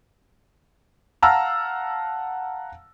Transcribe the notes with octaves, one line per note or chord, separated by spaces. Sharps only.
F5 F#5 A5 A#5 E6 F6